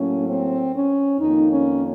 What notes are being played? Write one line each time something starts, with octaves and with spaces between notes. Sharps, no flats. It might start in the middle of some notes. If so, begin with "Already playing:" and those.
Already playing: A2 F#3 A#3 C#4
C4
C#4
F2 D#3 A#3 D#4
C#4